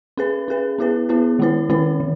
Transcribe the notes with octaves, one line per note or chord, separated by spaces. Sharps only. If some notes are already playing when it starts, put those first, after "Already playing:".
C#4 G#4 B4
C#4 G#4 B4
B3 E4 G#4 B4
B3 E4 G#4 B4
D#3 G#3 C#4 E4 B4
D#3 G#3 C#4 E4 B4
D#3